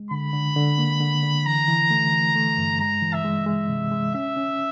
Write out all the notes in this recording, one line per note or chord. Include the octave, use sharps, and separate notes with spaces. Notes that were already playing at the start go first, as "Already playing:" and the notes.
Already playing: G#3
D3 B5
D3
D3
A#3
D3
D3
E3 A#5
E3
A3
E3
A3
G2
G#3 A#5
E3
E5
G#3
G#3 E5
C3
G#3
C#4 E5
C#4